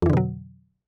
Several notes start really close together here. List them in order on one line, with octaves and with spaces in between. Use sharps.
F2 E3 D3 B2 F#3